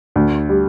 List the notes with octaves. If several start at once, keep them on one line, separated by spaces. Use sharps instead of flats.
D2
G3